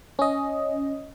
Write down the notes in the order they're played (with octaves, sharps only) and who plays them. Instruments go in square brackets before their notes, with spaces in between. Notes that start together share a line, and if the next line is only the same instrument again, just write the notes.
[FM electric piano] C#4 D#5